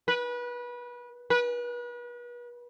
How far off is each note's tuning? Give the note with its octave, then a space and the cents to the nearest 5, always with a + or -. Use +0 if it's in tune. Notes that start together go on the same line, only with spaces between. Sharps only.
B4 -25
B4 -35